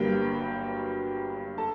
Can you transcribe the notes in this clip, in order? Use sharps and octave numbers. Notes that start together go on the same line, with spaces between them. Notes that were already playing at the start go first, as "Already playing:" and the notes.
Already playing: G1 G2 F#3 A#3 G4 G5
A4 A5